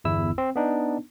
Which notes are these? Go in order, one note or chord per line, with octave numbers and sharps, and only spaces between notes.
G1 E2 E4 E6
C4
B3 D4 D#4